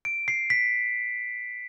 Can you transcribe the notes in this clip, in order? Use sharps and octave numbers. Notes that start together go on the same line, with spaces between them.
D7
C7
B6